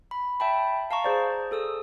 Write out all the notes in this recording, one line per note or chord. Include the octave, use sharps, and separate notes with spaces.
B5
E5 G5 A5 B5
F5 A5 A#5 C#6
G#4 C5 D5
G#4 A4 D#6 E6